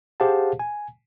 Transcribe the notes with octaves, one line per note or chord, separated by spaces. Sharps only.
G4 G#4 C5 F5 F#5 A5
G#5